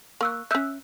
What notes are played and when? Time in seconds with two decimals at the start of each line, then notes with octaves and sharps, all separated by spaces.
0.21 A#3 C#6 E6 F#6
0.51 C#4 E5 E6 F#6 G6